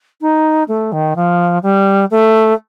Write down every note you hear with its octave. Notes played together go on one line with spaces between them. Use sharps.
D#4
A3
D#3
F3
G3
A3